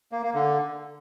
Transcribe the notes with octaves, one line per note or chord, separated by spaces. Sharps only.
A#3
A#3
D3